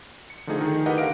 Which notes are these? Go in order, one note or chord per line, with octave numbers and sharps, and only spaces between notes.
C#7
D3 F3 A3 D#4 G#4
D#3
E4 G4 A#4 B4 D#5 F#5
D3 A#4 F5 D7